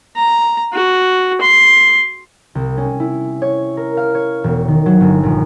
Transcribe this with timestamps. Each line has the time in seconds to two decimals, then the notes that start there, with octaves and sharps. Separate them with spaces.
0.16 A#5
0.73 F#4
1.41 C6
2.55 C2
2.77 C#4
3.00 E4
3.42 C#5
3.77 A#4
3.97 F5
4.15 C#5
4.44 E1
4.68 D#3
4.86 F#3
5.00 G1
5.23 A#1